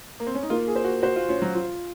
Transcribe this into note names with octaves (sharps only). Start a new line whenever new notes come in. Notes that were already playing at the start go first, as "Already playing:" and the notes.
A#3
C4
C#4
D#4
A#3 F4
G#4
C5
F#4
F#4 C5
F4
C#4 F4
F#3
F4